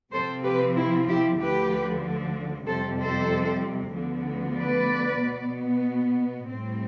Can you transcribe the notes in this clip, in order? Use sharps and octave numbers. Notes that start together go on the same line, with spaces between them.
C3 F3 C4 A4 C5
G4 B4
E4
E4 G4
D2 D3 F3 G4 B4
F2 C3 G3 A4 C5
A4 C5
D2 D3 F3 B3
B4 D5
B2 B3
A2 G3 C4